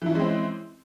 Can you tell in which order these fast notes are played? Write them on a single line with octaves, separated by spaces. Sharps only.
E3 E4 C#4 G#3 C4